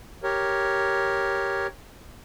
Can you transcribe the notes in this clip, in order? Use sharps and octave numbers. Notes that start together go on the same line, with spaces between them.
G4 A#4 C#5